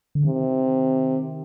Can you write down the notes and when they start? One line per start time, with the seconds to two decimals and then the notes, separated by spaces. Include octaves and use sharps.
0.15 D3
0.25 C3 D#3